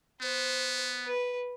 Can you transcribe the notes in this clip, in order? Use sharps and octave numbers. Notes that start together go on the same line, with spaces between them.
B3 C5
B4